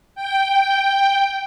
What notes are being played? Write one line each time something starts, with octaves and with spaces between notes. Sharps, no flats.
G5